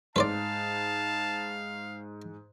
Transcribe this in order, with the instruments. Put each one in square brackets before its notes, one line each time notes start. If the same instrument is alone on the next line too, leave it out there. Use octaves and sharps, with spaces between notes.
[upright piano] G#2 [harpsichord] B4 C5 D5 [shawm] F5 [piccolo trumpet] A5